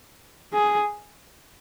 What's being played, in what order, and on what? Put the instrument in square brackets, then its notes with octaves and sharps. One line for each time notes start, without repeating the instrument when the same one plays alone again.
[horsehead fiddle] G#4